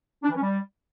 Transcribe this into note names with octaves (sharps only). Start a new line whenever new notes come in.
D4
E3
C#4
G3